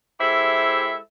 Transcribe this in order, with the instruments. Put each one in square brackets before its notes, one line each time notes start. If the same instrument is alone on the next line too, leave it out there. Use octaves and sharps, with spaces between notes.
[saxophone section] G#3 E4 G4 A4 C5 E5